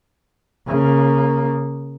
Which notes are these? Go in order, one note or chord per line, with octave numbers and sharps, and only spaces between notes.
C#3 A#3